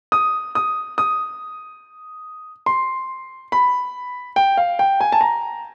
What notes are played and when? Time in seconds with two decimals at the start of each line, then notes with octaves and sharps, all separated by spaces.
0.12 D#6
0.55 D#6
0.98 D#6
2.66 C6
3.52 B5
4.36 G5
4.57 F5
4.79 G5
5.01 G#5
5.12 A5
5.21 A#5